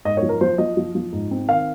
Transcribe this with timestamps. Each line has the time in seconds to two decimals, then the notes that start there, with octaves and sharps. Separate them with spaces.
0.05 G#2 D#5
0.17 C#5
0.23 F3
0.29 A#4
0.41 F3 C5
0.58 F3 D#5
0.77 F3
0.95 F3
1.12 G#2
1.31 C4
1.48 D#3 F5